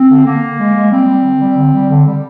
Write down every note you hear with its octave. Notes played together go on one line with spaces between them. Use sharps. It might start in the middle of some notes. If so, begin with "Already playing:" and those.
Already playing: C4
D3
D3 A#3
D3
G#3
G#3
G3 C4
G3
D3
G3
D3
G3
D3
G3